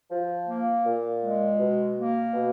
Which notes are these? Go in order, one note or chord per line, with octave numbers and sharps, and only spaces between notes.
F3
A#3
A#2
G#3
B2
A#3
B2